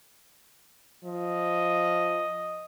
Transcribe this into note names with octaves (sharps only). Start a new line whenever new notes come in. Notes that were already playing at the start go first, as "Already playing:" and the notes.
F3 D#5